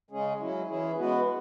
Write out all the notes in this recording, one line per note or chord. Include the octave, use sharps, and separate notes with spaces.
C#3 G#3 C#4 G#4
F#3 C#4 E4
E3 C#4 E4 G#4
G#3 B3 F#4 B4